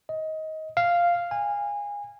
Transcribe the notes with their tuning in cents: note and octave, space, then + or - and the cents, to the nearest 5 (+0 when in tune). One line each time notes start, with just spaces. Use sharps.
D#5 +20
F5 -5
G#5 -25